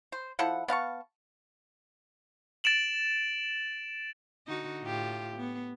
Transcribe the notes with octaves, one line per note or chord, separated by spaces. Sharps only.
C5
F3 E4 A4 F#5
B3 F5 A5 C#6
A6 D7 E7 F#7
D3 D#4 F#4
A2 F4 G4
B3